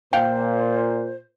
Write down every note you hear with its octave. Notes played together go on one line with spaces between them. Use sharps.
A#2 C5 F5 G5